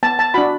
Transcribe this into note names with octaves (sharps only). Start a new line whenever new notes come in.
B3 A5
A5
D4 F#4 B5